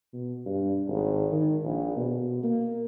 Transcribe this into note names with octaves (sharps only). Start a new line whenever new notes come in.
B2
G2
G#1
D#3
A#1
B2
A#3